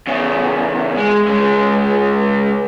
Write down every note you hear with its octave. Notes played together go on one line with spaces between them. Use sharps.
E2 C#3
G#3
C#3 G#3